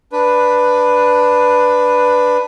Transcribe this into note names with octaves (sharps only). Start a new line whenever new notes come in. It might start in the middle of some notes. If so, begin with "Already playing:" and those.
D4 B4